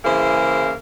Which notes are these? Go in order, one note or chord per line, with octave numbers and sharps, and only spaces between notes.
C#3 E3 A#3 E4 G#4 C5